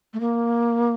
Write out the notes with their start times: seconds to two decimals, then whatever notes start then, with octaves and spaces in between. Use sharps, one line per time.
0.13 A3
0.20 A#3